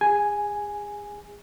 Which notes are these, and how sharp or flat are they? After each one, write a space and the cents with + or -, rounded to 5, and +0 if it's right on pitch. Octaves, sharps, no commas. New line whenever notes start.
G#4 -35 G#5 +0